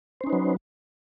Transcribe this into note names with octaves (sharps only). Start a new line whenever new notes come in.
F#3 C#4 D#4 B4 C5